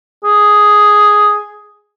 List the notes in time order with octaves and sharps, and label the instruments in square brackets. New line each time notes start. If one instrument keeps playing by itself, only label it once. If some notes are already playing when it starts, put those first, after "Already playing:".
[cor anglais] G#4